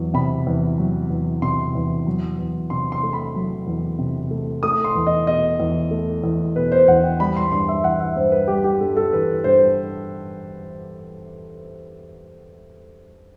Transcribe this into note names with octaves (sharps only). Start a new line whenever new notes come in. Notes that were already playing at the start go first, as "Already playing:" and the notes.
Already playing: E2 F#3
C3 B5
E2
F#3
E2
C3 C6
E2
F#3
E2
C3 C6
C6
A3
B5
F#3
E2
C3
A3
A3 D#6
C6
E2
D#5
B2 D#5
E2
A3
E2
B2 B4
C5
E2 F#5
G5
G3 B5
C6
G2 C6
E5
E3 F#5
E5
G2 C5
B4
G3 G4
G4
G2 A4
A4
E3 B4
G2 C5